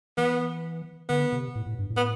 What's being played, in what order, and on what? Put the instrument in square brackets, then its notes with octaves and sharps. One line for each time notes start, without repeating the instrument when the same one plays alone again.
[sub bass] E3 [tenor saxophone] B3
[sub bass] D3 [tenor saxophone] B3
[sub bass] C3
A2
A2
G2
A2
[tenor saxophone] B3